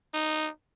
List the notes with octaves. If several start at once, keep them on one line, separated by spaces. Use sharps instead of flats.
D#4